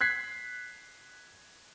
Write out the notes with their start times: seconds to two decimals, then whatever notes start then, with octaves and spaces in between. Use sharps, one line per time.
0.01 F#6 G#6 B6 C7